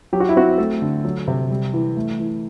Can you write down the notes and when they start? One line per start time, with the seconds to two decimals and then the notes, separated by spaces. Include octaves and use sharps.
0.13 F#3 G4
0.20 F#4
0.29 E4
0.36 C4 F#4
0.58 A3 A4
0.82 D3
1.05 F#3
1.28 C3
1.51 G3
1.73 E3
1.97 A3
2.19 E3